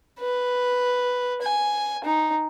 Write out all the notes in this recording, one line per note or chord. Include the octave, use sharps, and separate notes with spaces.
B4
G#5
D#4